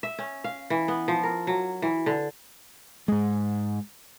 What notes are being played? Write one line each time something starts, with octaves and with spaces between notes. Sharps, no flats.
E5
C#4
F5
E3
B3
F3
A#4
F#3
E3
D3
G#2 G#3